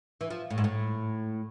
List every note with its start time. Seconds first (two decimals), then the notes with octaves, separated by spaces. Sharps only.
0.21 E3
0.30 F3
0.50 A2
0.58 G#2
0.64 A2